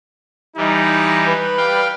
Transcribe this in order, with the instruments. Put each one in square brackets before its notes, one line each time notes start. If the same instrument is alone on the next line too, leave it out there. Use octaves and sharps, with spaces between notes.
[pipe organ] E3 G3 [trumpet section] D#4
[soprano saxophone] B4
[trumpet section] G3 [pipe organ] F5 G5